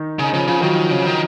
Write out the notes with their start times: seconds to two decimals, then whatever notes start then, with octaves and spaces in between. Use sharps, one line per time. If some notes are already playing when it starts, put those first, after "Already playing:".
Already playing: D#3 D#4
0.19 C#3 D#4
0.33 C#3 F3 F4
0.47 C#3 F3 F4
0.62 D#3 F#3 F#4
0.91 C#3
1.06 D#3